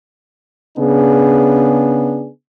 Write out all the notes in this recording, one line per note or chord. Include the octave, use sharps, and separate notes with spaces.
C#3 B3 D4 G#4